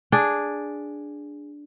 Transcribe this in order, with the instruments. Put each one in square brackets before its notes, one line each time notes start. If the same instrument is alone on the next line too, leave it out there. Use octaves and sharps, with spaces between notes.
[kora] D4 G#4